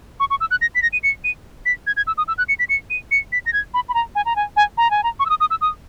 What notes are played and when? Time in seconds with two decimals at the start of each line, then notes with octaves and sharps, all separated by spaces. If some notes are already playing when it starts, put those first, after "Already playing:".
0.20 C#6
0.30 C#6
0.40 E6
0.51 F#6
0.61 A#6
0.75 B6
0.82 A#6
0.93 D#7
1.03 C#7
1.24 D#7
1.66 B6
1.87 G#6
1.97 G#6
2.07 E6
2.18 D#6
2.28 E6
2.38 F#6
2.49 C#7
2.59 B6
2.69 C#7
2.90 D#7
3.11 C#7
3.32 B6
3.46 A#6
3.53 G#6
3.74 B5
3.89 B5
3.94 A#5
4.15 G#5
4.26 A#5
4.36 G#5
4.56 G#5
4.77 A#5
4.91 G#5
5.03 A#5
5.19 C#6
5.26 E6
5.30 D#6
5.40 D#6
5.50 E6
5.61 D#6